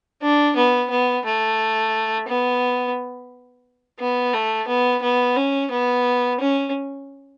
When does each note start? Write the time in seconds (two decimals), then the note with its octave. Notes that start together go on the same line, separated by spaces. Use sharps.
0.22 D4
0.56 B3
0.90 B3
1.25 A3
2.27 B3
4.00 B3
4.33 A3
4.68 B3
5.02 B3
5.36 C#4
5.71 B3
6.40 C#4